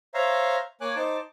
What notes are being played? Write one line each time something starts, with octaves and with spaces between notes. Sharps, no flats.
C5 C#5 E5 F5 A#5
A#3 C#5 G#5 D6 F#6
D#4 C5 A5 D6